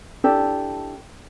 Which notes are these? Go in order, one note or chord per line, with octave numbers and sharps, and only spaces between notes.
D4 E4 G4 A4